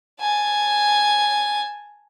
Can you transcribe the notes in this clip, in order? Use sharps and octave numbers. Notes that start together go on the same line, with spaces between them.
G#5 A5